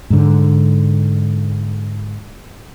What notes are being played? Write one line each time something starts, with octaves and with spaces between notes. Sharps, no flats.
G#2 D3